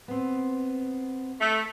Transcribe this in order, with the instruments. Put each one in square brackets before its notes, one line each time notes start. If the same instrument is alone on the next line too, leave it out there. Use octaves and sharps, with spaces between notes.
[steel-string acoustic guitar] B3 C4
[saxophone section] A3